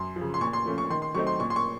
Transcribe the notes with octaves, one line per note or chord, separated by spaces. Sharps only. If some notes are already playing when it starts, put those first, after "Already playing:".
Already playing: F#2 C6
C#3 F3
C6
A#2 C#6
C6
F3 A3 C#4
C#6
D#3 C6
C6
F#3 A3 C4 D#4 C#6
C6
A#2 C#6
C6
C#6